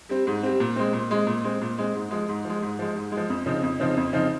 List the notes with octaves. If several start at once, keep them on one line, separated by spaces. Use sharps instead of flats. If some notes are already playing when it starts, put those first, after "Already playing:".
G3 C4
G#2
G3 C4
A#2
G#3 C4
A#2
G#3 C4
A#2
G#3 C4
A#2
G#3 C4
G#2
F3 G#3
G#2
F3 G#3
G#2
F3 G#3
G#2
G#3
F3
F2
C#3 F3 C4 D#4
F2
C#3 F3 C4 D#4
F2
C#3 F3 C4 D#4